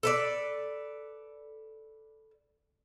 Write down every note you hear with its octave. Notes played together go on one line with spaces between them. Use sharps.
A4 B4 D5